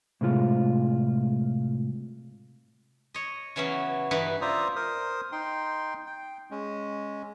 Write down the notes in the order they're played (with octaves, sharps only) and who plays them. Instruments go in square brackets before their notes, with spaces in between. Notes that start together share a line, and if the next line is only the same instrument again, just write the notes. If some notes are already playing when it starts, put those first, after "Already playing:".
[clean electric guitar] A2 C3 G#3 F4
[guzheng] C#5 D#5
C#3 E3 F#3 B3 C#4
G2 E3 D#4 B4
[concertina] F4 C5 D5 E5 A#5 D#6
A#4 C5 D#6
D#4 G5 C6
G5
G#3 C#4